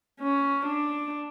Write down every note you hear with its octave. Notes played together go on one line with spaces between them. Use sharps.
C#4
D4